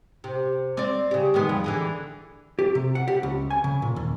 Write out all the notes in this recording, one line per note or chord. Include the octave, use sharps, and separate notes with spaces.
C3
C4 D5
C#3 G4
D#3 G#3 B3
F2
D3 E3 G#4
G4
C3
F#5
G4
C#2
G#5
C#3
A#2
D#2